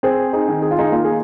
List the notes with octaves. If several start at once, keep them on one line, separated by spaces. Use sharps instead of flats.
C4 G#4 C5
D#4 G#4
D#3
G#4
F4
D#4 G#4
A#3 F4
G#4